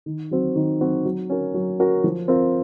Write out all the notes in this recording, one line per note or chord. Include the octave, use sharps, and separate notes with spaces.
D#3
F#3 C4 F#4
D#3
F#3 C4 F#4
F#3
C#4 F#4 A#4
F#3
C#4 F#4 A#4
F3
C4 F4 A#4